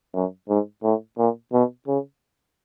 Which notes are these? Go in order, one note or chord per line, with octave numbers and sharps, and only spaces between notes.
F#2
G#2
A2
A#2
B2
C#3